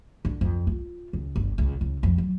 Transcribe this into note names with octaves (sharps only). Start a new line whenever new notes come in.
D3
F2
F4
C#2
G1
C#2
C#2
F2
F#3